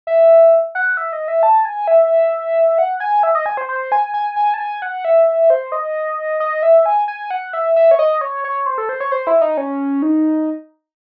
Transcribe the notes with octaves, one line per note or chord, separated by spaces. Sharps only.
E5
F#5
E5
D#5
E5
A5
G#5
E5
F#5
G#5
E5
D#5
G#5
C5
C5
G#5
G#5
G#5
A5
G#5
F#5
E5
C5
D#5
D#5
E5
G#5
G#5
F#5
E5
E5
C#5
D#5
C#5
C#5
C5
A4
C5
C#5
C5
E4
D#4
C#4
D#4